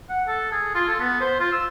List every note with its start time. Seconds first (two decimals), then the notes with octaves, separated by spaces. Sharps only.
0.09 F#5
0.27 A4
0.52 G#4
0.75 F4
0.88 A4
1.00 B3
1.21 C5
1.40 F4
1.52 E6